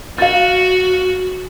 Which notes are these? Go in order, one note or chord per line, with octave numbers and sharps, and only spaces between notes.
F#4 F5 A6